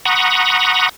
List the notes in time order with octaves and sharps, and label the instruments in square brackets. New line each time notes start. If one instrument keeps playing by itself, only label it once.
[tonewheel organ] F#5 A#5 B5 C#6 D#6